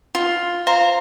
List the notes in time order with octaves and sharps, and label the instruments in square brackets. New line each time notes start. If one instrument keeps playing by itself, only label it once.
[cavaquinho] F4
[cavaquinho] C5 [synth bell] F5 [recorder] A#5